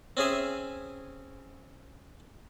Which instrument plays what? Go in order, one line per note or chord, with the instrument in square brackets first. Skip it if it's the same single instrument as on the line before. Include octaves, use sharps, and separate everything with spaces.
[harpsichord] C4 C#4 G#4 E5